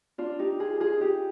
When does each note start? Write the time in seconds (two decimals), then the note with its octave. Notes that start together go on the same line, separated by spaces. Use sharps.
0.18 D4 F4
0.39 D#4 G4
0.60 F4 G#4
0.80 F4 G#4
1.01 D#4 G4